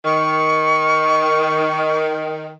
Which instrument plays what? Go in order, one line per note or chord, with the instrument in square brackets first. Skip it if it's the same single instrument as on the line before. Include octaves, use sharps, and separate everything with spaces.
[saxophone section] D#3 [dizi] C#6